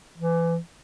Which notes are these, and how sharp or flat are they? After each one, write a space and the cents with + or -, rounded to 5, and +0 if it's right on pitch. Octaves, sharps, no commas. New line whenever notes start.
E3 +25